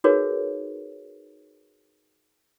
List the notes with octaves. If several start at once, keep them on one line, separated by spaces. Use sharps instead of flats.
D#4 F#4 G#4 A#4 B4 C#5